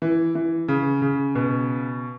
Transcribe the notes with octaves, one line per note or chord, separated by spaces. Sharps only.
E3
E3
C#3
C#3
B2